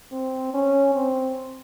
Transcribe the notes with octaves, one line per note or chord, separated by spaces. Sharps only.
C4
C#4
C4